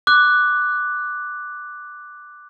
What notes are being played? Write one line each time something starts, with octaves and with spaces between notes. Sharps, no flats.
D6 F#6